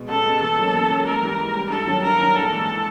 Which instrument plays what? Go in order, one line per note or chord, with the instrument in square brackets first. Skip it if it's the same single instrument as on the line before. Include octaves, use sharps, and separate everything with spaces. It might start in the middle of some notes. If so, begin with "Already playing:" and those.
Already playing: [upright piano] B2 G#3
[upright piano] C#2 [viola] A4
[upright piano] B2 G#3
[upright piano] E2 [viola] A4
[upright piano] C#3 F#3 A#3
E2
C#3 F#3 A#3
[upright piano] G#2 [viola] A#4
[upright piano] E3 G3
G#2
E3 G3
[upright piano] G2 [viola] A4
[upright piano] D#3 F#3
[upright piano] G2 [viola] A#4
[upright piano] D#3 F#3
[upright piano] A#1 [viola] A4
[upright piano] G#2 E3